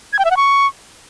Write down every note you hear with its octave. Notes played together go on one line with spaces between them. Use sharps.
G#6
G5
E5
F#5
C#6